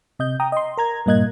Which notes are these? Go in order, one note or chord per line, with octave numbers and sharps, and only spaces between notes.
C3 D#5 G6
G5 A#5 D#6
D#5 C6
A#4 A#5 G#6
G2 A#2 A#3 D#5 F#6 G#6